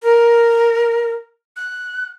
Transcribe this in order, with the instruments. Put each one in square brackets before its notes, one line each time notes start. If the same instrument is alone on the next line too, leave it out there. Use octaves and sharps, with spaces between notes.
[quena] A#4
F#6